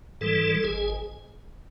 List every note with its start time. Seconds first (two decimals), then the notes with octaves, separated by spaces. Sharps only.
0.21 G#2 E3 G3 A4
0.55 A4
0.64 G#1 G#4